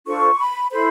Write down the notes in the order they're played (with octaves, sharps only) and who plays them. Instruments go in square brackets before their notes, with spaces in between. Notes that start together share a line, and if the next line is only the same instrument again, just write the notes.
[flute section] D4 F4 A4 C5 C#6
C6
B5
E4 A4 C5 B5